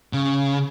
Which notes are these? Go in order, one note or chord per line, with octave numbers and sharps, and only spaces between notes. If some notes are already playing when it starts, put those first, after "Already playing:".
C#3